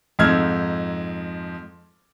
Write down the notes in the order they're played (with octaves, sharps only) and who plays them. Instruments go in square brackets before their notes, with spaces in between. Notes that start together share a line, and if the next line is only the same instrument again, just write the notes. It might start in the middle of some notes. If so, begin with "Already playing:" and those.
[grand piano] F2 G#2 D#4 E6 F6 G#6